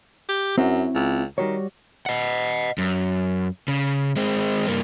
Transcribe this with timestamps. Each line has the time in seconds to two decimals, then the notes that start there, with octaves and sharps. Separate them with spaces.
0.29 G4
0.58 F#2 C4 E4 F#4
0.95 C#2
1.38 D#3 G3 F#4 C#5
2.06 D#5 F#5
2.78 F#2
3.68 C#3
4.16 G#3 C4
4.67 G2 A#3